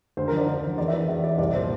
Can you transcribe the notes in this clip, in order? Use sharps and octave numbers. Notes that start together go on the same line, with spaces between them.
D2 C5
D3 F3 A#4
D5
D2
D3 F3
E2 D5
E5
E3
E2 E5
E3 D5
C2 D5
A#2 F3 C5